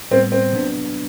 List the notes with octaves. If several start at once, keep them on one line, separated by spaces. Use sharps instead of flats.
A2 G3 B3 C4
C4
C3 F#3 B3 D4